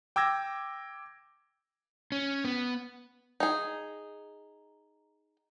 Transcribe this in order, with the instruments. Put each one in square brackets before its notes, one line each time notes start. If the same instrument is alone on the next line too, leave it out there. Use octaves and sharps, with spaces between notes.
[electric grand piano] G5 D6 E6 G#6 A#6
[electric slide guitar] C#4
B3
[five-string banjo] D#4 G#4